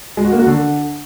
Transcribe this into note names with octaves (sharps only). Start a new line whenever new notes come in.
G#3
F#4
A#3
F#4
D3